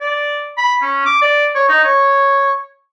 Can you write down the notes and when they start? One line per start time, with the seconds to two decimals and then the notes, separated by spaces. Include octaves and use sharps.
0.01 D5
0.57 B5
0.82 C#4
1.05 D6
1.22 D5
1.55 C#5
1.69 D#4
1.84 C#5